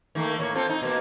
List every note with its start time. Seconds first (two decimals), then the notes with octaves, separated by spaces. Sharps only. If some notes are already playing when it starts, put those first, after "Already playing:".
0.15 D#3 A3 A#3
0.39 A2 A#3 C#5
0.55 C4 F4 A4
0.69 D#4
0.82 B2 A#3